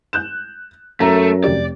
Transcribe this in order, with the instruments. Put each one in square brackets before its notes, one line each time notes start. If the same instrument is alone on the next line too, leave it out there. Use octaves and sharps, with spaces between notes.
[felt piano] F#6 G6 E7
[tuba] F#2 [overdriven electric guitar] A3 [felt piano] E5 A#5
[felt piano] F1 G4 [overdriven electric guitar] D5